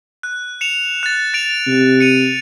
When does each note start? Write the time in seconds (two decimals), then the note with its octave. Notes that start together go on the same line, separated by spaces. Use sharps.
0.23 F#6
0.61 C#7 E7 F7
1.03 F#6 A6
1.34 A6 D7 F7
1.67 C3
2.00 C#7 D#7 F7